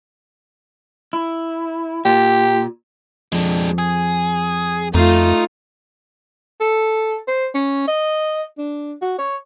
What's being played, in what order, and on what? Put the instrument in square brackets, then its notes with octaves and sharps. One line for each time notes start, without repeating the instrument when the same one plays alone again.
[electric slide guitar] E4
[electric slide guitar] A#2 [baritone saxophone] G4
[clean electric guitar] F2 [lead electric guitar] G#3 D4
[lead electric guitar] G#4
[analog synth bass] F2 [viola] A3 F4 [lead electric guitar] D#4
[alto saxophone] A4
C5
C#4
D#5
D4
F#4
C#5